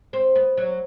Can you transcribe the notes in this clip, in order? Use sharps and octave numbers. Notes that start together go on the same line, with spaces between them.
C4
B3
F#3